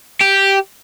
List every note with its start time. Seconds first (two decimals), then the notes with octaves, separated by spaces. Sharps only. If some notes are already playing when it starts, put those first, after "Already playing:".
0.21 G4